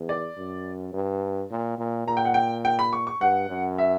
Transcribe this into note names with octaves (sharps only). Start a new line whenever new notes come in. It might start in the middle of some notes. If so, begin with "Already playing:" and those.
Already playing: E2
D5
F#2
G2
A#2
A#2
A#2 A#5
G5
F#5
G5
G5
B5
C#6
C#6
G2 F#5
F#2
E5